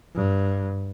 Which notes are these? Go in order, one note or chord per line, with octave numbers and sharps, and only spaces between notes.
G2